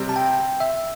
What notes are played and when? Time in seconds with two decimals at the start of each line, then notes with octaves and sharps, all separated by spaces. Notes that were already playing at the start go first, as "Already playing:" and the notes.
Already playing: C3 G3 C4
0.09 A5
0.16 G5
0.60 E5